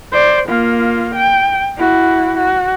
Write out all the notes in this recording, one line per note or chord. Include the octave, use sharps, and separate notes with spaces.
C5 D5
A#3 F4
G5
E4 F#4
F#4